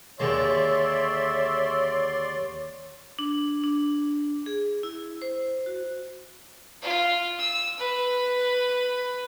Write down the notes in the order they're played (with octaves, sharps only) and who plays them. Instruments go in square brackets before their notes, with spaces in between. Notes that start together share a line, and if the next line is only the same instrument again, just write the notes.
[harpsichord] D#2 D3 G#3 [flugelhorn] C#5 [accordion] D5 C6 [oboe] E5
[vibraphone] D4
D4
G#4
E4
C5
F#4
[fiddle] F4
E6
B4